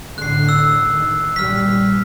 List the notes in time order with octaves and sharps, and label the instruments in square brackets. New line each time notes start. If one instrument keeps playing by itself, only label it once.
[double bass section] A2 D3 [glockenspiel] F#6 C7
[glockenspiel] E6
[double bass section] D#3
[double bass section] A#1 G2 G3 [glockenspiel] F6 B6